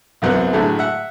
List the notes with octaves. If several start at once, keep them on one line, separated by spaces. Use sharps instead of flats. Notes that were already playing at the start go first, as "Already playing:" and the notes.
C2 F#2 F#3 B3 C4 F#6
A2 D3 F#3 G#3 A3
E5 F#5